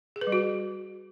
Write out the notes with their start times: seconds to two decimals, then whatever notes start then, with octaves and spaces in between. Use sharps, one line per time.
0.16 G#4
0.21 B4
0.27 G3
0.32 F#4